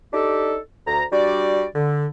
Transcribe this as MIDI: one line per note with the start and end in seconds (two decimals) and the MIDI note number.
0.14 0.58 62
0.14 0.58 63
0.14 0.58 67
0.14 0.58 69
0.87 1.04 38
0.87 1.04 82
1.12 1.66 55
1.12 1.66 62
1.12 1.66 66
1.12 1.66 74
1.75 2.08 50